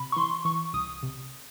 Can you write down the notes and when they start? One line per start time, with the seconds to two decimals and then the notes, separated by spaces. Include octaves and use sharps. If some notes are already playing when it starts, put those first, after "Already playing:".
Already playing: C3 B5
0.12 C#6
0.16 E3 C6
0.45 E3 C#6
0.73 C2 D#6
1.03 C3